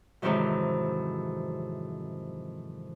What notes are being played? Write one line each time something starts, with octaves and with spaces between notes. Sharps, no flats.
F2 G#2 C3 D#3 E3 F#3